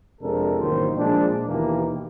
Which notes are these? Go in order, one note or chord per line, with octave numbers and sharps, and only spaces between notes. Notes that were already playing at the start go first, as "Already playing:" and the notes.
F2 C3 G#3 D4 A4 A#4
A1 D#3 F#3 A#3 C5
A#2 F3 G#3 D4
D#2 B2 D#3 E3 A#3 G4